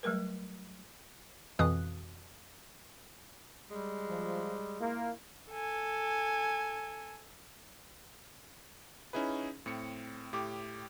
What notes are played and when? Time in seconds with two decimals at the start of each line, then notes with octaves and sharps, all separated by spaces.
0.03 F#3 G3 A3 A#4 B4
1.59 F2 B2 E3 F5 D#6 F#6
3.71 G3 G#3
4.09 F3
4.81 A#3 E4 F4
5.50 A4 G#5
9.13 C#4 D#4 E4 G#4 B4
9.66 A2 C4 C#7
10.33 A2 G4 D6